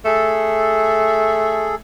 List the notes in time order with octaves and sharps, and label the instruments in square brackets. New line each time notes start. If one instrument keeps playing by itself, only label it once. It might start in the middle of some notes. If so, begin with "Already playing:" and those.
[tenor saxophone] A3 [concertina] G#4 A4